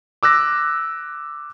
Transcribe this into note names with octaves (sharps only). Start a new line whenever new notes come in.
D6 E6 F#6 A#6